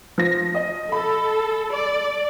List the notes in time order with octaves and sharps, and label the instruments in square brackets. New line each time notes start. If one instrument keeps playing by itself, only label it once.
[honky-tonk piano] F3 A#6
D#5
[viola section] A4 [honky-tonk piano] B5
[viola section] D5